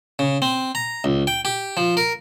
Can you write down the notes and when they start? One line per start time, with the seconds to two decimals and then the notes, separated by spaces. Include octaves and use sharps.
0.19 C#3
0.42 C4
0.75 A#5
1.04 C#2
1.27 G5
1.45 G4
1.77 F3
1.97 A#4